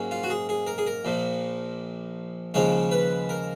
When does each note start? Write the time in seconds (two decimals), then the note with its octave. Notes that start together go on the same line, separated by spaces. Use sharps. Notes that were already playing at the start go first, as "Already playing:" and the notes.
Already playing: G#2 F#3 A#3 C#4
0.11 F4
0.23 F#4
0.30 G#4
0.49 G#4
0.67 A#4
0.78 G#4
0.86 A#4
1.05 A#1 A#2 F3
2.54 D#2 C#3 F3 G#3 C#4 C#5
2.91 B4
3.29 A#4